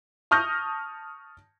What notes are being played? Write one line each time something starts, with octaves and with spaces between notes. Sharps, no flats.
A5 C#6 D#6 F6 G6 A#6